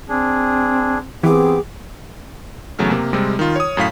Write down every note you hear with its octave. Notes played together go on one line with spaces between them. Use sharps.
C4 D4 G#4
E3 B3 C4 G4 G#4 D6
E2 C#3 F#3 A3 F6
C3 A#3
C3 G3 G#3 C4
D#3 F4
C#5 D#6
F#2 A2 F5 B6